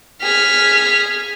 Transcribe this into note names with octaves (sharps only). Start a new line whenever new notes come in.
G#4 F6 B6